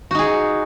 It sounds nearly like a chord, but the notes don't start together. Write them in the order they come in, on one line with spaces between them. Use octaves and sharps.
F#4 D#4 G#4